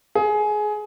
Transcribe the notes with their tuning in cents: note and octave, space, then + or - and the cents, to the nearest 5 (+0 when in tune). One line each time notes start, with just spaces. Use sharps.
G#4 +20